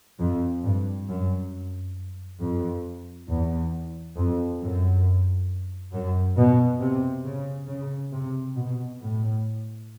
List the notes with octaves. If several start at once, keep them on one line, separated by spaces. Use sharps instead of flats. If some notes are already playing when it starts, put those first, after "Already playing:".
F2
G2
F#2
F2
E2
F2
F#2
F#2
B2
C3
C#3
C#3
C3
B2
A2